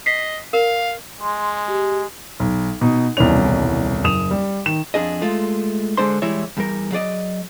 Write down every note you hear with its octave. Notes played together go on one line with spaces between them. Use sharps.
D#5 B6 C7
A#4 F5
G#3 C6
G4
B1
B2 D#4
D#1 C2 B2 E3 C#4 F7
F#1 D#6 E7 F7
G3
D#3 E7
F2 D4 G#4 D#5
G#3 A3 F4
D3 G#3 D4 C5 C6
E3 G3 G#3 E4 C#5 E5
E2 G3 A#4
F#3 G#4 D5 D#5